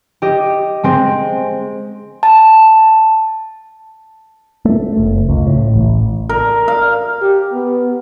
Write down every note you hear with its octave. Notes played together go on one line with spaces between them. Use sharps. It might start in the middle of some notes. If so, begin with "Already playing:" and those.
G4 D#5
G#3 C4
A5
A3
F#1
C#2
A2
A1
A#4
F5
G4
B3